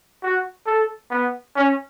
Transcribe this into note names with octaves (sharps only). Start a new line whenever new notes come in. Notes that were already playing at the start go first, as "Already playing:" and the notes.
F#4
A4
B3
C#4